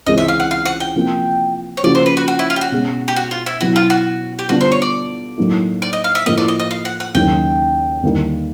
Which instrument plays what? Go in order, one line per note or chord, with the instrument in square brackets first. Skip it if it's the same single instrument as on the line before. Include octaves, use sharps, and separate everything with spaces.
[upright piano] C#2 C3 E3 G#3 C#4 [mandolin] D#5
[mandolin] E5
F5
F#5
F5
F#5
G5
[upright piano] C3 F3 A#3
[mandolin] C#5
[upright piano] C#3 F3 A#3 C#4 F#4 [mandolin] D5
[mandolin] C5
B4
F#4
F#4
E4
F4
G4
F#4
[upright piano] B2 G#3 C#4
[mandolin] G4
F#4
F4
E4
[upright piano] B2 F#3 B3 E4 [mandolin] F#4
[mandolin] F4
F#4
G4
[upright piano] D3 G3 B3 D4 F4 [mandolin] F#4
[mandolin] C5
C#5
D5
[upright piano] A2 F#3 A#3 D#4
[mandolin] D5
D#5
F5
E5
[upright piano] A2 F3 A#3 [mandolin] D#5
[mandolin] D5
D#5
D#5
F5
F#5
F#5
[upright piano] D#2 C#3 F#3 A#3 D#4 [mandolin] G5
[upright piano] D#2 D3 G3 A#3 D#4